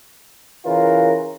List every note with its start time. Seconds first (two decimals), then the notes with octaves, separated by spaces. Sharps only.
0.66 C#3 E3 F4 A#4